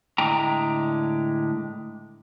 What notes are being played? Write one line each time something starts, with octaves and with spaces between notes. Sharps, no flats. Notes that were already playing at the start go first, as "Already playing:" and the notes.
A2 D3 G#3 G5 A#5